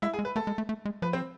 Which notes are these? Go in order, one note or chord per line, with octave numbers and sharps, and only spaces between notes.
G#3 E4 E5
G#4 G#5
G#3
B4
A3 A4
G#3
A3
A3
G#3
F3 B4
C4 C5